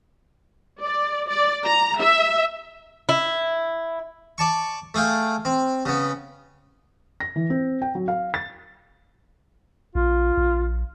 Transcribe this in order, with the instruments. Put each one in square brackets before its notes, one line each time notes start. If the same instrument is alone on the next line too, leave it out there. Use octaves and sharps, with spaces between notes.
[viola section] D5
D5
A#5
E5
[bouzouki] E4
[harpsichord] D5 A5 C#6
A3 G#4 F5 G5
C4
C#3 B3
[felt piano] A#6
E3
C4
G5
F#3
F5
A6
[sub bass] A#1 [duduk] F4
[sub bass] A#1